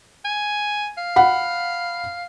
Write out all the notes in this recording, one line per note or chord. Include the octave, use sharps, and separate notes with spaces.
G#5
F5
F#5 B5